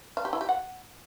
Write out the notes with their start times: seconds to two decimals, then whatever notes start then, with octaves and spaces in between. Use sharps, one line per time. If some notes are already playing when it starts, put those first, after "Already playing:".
0.17 F5
0.25 G4
0.33 E4
0.41 G4
0.49 F#5